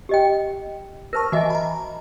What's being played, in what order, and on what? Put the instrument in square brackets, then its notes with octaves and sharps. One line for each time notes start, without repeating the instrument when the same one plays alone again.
[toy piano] G4 D#5 G5
[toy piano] A#4 C5 A5 [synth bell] C#6 F6 A#6
[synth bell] E3 E5 [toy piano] F#4 D#5 G#5
[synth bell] A#5 B5